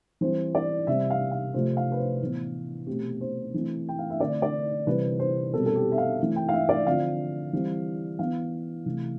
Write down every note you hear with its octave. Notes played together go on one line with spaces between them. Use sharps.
E3 G3 C4 C5
D5
C3 G3 C4 E5
F5
F5
C3 F3 A3 C4 C5
F5
B4
C5
A2 E3 B3
B2 A3 C4 G4
C5
E3 A3 C4
G5
F5
E5
D3 A3 C4 D5
D5
C3 E3 G3 C4 B4
C5
B2 G3 C4 A4
A4
G4
E5
F5
E3 A3 C4
G5
F5
E5
D5
D3 F3 C4 F5
E3 G3 C4
E3 B3 F5
C3 E3 A3